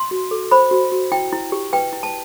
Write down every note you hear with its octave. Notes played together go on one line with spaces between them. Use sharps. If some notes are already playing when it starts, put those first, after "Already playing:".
Already playing: C6
F#4
A4
C5 B5
F#4
F#4
E4 G5
E4
G4
B4 G5
E4
A5